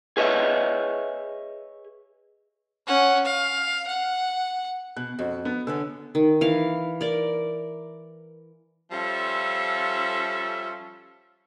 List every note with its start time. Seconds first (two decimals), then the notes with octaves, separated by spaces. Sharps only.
0.17 G#4 B4 C#5 D#5 E5
2.87 C#4 F#5
3.25 F5
3.88 F#5
4.96 B2 F#6
5.19 F2 F#4
5.45 B3
5.67 D3 B3 C#4 E6
6.15 D#3
6.41 E3 F5
7.01 A#4 D5
8.92 F3 G3 C#4 F4 A4 E5